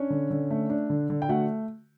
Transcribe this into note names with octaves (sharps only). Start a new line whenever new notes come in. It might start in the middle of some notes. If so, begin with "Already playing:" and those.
Already playing: C#4 D4 C#5
D3
D3
A3
D4
D3
D3
G5
A3 F#4 F#5